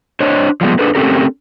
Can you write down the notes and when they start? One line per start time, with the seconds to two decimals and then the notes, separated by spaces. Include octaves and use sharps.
0.20 D4 C5 C#5 D#5
0.61 F3 G3 G#3 B3
0.79 D4 G#4 A4 B4 C5
0.95 A3 C4 C#4 G4 A4 A#4